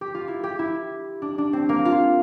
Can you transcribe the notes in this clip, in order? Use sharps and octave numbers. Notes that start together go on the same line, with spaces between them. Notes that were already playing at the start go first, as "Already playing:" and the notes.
G4
F4
E4
G4
E4
D4
D4
C4
A#3
F4